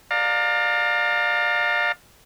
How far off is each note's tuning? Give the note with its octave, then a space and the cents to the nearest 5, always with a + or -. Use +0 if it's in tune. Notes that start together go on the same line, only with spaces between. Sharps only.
D5 +15 F5 +25 A#5 -25